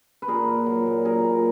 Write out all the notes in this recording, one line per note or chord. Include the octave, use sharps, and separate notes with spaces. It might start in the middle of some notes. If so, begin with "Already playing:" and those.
B4
A#2 G#4 A#4
A#2
F#3
A#2
F#3 G#4 A#4
A#2